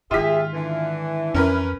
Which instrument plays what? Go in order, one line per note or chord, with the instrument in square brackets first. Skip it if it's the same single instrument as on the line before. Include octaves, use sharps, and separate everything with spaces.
[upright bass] G#2 D#3 [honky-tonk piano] F4 B6 [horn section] G4 G#4 E5
[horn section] D3 E3
[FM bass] F2 [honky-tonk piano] C#4 A#4 B4